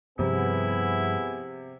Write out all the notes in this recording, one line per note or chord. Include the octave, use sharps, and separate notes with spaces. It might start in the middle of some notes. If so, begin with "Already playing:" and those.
G2 C3 F3 G3 B3 E4 G#4